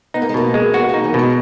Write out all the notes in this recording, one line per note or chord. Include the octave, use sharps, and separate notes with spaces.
B3 D#4
A#3
G#3
B2 A#3
G#3
B3 F#4
A#3 D#4
E3
B2 G#3